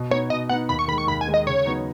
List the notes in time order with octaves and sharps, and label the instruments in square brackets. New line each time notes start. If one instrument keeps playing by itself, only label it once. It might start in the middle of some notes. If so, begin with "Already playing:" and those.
Already playing: [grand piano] B2
[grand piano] B3 D#4 [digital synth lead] C#5
[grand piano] B2 [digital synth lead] D#5
[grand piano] B3 D#4 [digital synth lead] F#5
[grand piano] D#2 [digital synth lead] B5
[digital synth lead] C#6
[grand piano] D#3 [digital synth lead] B5
[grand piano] G#3
[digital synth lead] C#6
[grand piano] D#2 [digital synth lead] B5
[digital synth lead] G#5
[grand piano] D#3 G#3
[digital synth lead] D#5
[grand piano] C#3 [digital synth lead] C#5
[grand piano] F#3 B3 D#4